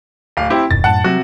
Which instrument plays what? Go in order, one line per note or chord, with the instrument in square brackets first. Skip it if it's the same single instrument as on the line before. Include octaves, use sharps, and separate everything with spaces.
[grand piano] D1 F5
C4 E4 G4
[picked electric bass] D#1 F#2 B2 [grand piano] A6
[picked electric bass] F#2 A2 [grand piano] F#5 A5
[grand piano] C3 F#4 [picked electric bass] F#3